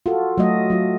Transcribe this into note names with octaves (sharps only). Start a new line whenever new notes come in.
F4 F#4 A4
F#3 A3 F#4 D#5
F#3 F4